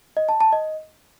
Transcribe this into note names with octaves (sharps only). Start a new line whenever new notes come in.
D#5
A5
A5
D#5